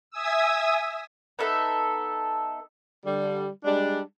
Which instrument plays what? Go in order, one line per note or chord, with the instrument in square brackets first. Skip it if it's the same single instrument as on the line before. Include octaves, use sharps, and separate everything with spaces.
[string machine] E5 G#5 D#6 E6
[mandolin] B3 D#4 A4 E5
[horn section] D3 G3
G3 G#3 D4